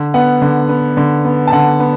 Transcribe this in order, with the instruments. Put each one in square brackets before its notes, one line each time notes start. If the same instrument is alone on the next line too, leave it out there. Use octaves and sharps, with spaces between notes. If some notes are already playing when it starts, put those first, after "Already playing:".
Already playing: [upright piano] D3
B3 F#5
D3
B3
D3
B3
A5
D3 F#5
B3